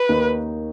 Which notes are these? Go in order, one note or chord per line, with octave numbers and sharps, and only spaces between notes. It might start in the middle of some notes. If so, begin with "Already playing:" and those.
Already playing: B4
D#2 D#3 A#3 D#4